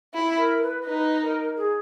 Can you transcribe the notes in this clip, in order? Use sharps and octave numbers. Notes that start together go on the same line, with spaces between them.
E4
A#4
B4
D#4 B4
A#4
G#4